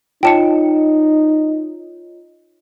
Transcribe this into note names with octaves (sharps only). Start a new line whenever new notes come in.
D#4 F4 C#5 D#5 G5 A5 C#7